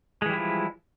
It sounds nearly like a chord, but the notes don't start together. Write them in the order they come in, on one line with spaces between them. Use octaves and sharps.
G#3 E3 G3 E4 F3